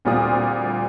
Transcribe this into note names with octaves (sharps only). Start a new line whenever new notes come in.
D2 A#2 G3 C4 F4 D#6